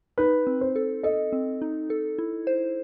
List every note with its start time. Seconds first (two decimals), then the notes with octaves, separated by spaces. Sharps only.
0.18 D#4 B4
0.47 C4
0.61 C5
0.76 A4
1.03 A4 D#5
1.32 C4
1.62 D#4
1.90 A4
2.19 E4
2.47 C5